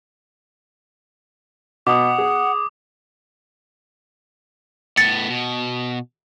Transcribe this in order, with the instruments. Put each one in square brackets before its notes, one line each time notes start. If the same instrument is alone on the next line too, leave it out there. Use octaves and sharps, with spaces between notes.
[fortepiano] B2 [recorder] F#5 [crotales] D6 D#6
[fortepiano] G#4
[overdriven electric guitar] A2 B3 [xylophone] A6 C#7
[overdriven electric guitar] B2